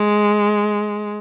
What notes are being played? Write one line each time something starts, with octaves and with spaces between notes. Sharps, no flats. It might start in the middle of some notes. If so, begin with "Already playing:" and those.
Already playing: G#3